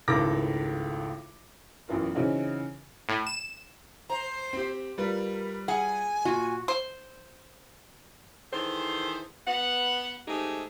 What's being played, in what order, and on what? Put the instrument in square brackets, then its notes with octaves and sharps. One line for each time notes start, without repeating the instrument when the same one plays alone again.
[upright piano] G#1 C#2 A2 A4 D6 A#6
A1 F#2 E3 B3 F4 A#4
C#3 E3 C4 C#4 D#4 F#4
[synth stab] A2
E7
[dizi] C5 [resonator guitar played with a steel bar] A#5
[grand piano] C4 G4
[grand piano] G3 F4 B4 [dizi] A#4
[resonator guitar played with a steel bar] G#4 F#5 [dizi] G#5
[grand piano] A#2 [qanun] F#4
[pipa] C5
[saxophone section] D#3 E3 G#4 A4 C5
B3 F#5
G#3 A3 C4 D#4 G4 G#4